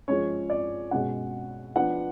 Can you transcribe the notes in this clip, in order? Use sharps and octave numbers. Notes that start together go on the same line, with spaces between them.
F3 G#3 C#4 C#5
D5
B2 G#3 C#4 F#5
F3 B3 D4 F#5